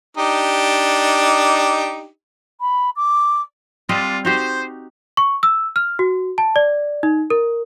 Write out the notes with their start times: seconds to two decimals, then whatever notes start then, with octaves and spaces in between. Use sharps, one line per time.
0.17 D4 D#4 G4
2.61 B5
2.96 D6
3.89 G3 C4 D4 F4 D#5
4.25 D#4 F#4 G4 C5
5.17 C#6
5.43 E6
5.76 F6
5.99 F#4
6.38 A5
6.56 D5
7.03 D#4
7.30 A#4